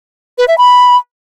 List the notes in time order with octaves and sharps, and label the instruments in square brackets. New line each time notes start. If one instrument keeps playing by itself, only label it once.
[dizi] B4
E5
B5